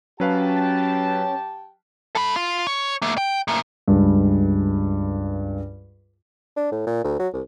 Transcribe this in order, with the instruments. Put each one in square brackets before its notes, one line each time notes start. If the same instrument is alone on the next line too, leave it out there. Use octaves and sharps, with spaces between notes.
[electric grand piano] F#3 B4 F5 [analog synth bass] C#4 [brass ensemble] G4 G5 A5
[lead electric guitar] A4 B5
F4
C#5
A3 A#3
G5
A2 A#3
[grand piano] C#2 G2
[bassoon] D4
A2
A#2
D2
F#3
C2